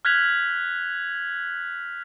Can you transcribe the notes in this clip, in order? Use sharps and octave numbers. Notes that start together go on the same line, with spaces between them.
F6 F#6 G#6 B6 F7 F#7